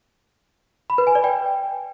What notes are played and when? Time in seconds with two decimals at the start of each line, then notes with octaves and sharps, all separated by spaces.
0.90 B5
0.98 B4
1.07 G#5
1.15 D5
1.24 G5